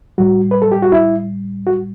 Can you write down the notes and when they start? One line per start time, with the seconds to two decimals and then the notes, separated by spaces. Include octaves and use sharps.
0.18 A2 G3 F#4
0.51 B4
0.62 A4
0.72 G4
0.82 F#4
0.92 E4
1.67 F#4